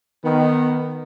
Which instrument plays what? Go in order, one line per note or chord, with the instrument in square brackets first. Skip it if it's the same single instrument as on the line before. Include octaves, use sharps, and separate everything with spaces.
[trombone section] D#3 [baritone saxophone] B3